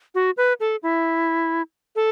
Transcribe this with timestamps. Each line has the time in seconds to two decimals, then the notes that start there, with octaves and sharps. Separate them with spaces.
0.15 F#4
0.37 B4
0.60 A4
0.83 E4
1.96 A4